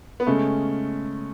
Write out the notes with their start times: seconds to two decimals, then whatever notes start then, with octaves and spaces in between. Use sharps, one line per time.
0.20 B3
0.27 C#3 G#3 A3 C#4